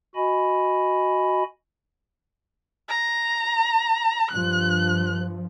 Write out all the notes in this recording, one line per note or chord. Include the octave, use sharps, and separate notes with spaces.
F#4 D#5 G#5 B5
A#5
G2 F3 F#6